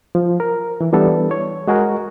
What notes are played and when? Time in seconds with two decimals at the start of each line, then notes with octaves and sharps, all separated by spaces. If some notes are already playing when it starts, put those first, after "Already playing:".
0.15 F3
0.40 A#4
0.81 E3
0.93 E3 G3 B3 D4 A4
1.31 C#5
1.68 G#3 F#4 G#4 A#4